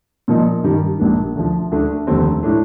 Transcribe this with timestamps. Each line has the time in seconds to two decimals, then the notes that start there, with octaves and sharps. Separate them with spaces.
0.28 A#2 F3 A#3 D#4
0.64 G2 D#3 G3
1.00 A#1 A#2 G3 A#3 D4
1.35 D2 D3 F3
1.72 D2 D3 A3 D4
2.07 F1 D#2 D3 A3 C4
2.43 A2 A3 D4